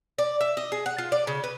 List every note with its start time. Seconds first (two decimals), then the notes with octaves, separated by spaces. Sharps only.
0.18 D5
0.41 E5
0.57 D#5
0.72 G#4
0.86 F#5
0.98 F4
1.12 D5
1.27 C#3
1.44 B4